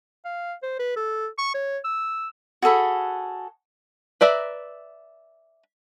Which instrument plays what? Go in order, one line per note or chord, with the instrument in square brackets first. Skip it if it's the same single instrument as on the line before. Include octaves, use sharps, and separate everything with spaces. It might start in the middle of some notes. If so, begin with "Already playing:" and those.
[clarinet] F5
C5
B4
A4
C#6
C#5
E6
[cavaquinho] F#4 G#4 A4 B5
[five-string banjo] B4 D5 E5 A#5